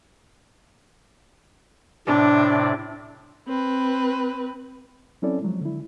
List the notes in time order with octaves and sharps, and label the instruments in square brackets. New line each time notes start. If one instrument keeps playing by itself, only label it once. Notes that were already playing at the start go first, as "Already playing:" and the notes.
[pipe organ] A2 C3 D5 [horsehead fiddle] D4
[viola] C4 B4
[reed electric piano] F#3 C4 C#4 E4 A4 D5
F3 F#3 G#3
D3 E4